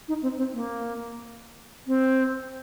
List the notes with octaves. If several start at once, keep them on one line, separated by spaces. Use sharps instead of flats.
D#4
C4
C4
A#3
C4